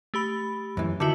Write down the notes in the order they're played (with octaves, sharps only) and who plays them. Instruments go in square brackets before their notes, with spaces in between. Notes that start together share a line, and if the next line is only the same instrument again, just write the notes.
[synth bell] A3 G4 B5
[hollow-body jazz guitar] F#2 E3
[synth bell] D3 F#4 [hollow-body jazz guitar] D#3 E4